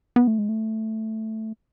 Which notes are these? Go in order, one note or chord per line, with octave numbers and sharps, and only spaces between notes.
B3
A3
G#3
A3